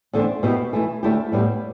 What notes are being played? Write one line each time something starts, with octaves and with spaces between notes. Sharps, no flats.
E2 D3 A3 C4
B2 B3 E4 G4
E3 A3 E4
D2 D3 A3 E4 G4
A2 G3 B3 E4 G4